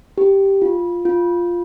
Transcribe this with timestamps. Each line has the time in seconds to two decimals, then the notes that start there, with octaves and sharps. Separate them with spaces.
0.18 G4
0.62 F4
1.05 F4